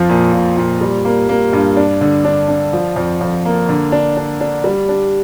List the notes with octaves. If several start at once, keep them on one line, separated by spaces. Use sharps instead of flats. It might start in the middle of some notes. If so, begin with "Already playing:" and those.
Already playing: F2 F3
A#2
A#2
A#2
G3
A#3
A#3
G2
D4
D3
D4
D4
F3
F2
F2
A#3
D3
D4
D4
D4
G3
D4